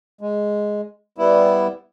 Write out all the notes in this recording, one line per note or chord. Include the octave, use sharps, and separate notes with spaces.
G#3
G3 B3 E4